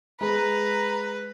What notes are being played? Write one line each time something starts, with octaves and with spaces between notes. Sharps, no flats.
G#3 B4 A#5